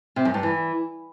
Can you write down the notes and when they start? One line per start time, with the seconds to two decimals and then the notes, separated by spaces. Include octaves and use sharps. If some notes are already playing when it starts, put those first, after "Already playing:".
0.16 C3
0.25 F#2
0.34 G2
0.43 E3